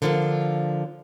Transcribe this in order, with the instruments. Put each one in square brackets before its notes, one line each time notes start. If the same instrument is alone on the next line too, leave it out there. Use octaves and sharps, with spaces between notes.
[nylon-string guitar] D3 F3 A#3